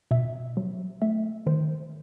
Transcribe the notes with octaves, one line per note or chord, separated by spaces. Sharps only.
B2 E5
F#3
A3 E5
D#3 C5